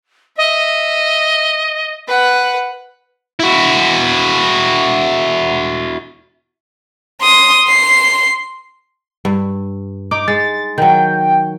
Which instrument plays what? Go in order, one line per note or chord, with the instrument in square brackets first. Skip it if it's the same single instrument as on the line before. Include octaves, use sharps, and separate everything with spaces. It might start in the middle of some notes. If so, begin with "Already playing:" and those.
[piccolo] D#5 [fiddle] E5
[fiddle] B4 F#5
[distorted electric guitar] E4 F#4
[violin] C6 D#6
C6 C7
[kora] G2
[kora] D#4 [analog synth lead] D6
[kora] G#3 [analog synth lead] A6
[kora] D#3 F#3 [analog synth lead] G5